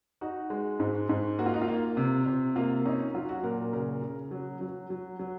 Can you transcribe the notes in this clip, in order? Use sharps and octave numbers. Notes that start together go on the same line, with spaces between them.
D#4 F#4
G#3
G#2
G#2
A#3 F#4
F4
D#4
F4
A#3
C3
C3
A#3 F4
C#4 D#4
F#3 F4
F#4
A#2 A#4
C#3 A#4
C#3
F#3
F#3
F#3
F#3